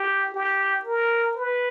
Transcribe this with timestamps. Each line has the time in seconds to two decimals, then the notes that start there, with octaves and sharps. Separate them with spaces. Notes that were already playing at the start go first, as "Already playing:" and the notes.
Already playing: G4
0.34 G4
0.85 A#4
1.36 B4